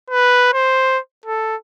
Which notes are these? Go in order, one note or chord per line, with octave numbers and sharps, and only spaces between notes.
B4
C5
A4